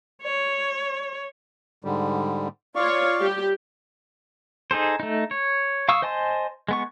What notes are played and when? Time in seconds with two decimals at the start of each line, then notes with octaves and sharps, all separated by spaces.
0.23 C#5
1.84 G#2 D3 G3
2.75 F4 C#5 D5 F5 C#6
3.20 G3 G4
4.71 D#4 G#4 A4 C5
5.00 A3 D#4
5.31 C#5
5.89 F5 C#6 D#6 E6
6.02 C5 D#5 G#5 A5 C6
6.69 G#3 B3 C#6